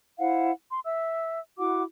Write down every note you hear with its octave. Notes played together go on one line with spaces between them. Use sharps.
E4 C5 F5 F#5
C6
E5 E6
E4 F#4 F#5 D6